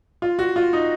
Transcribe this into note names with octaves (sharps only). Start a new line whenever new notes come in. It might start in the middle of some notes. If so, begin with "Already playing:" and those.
F4
F#4
F4
D#4